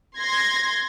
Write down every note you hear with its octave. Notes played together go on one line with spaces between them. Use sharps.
C6 G#6 A#6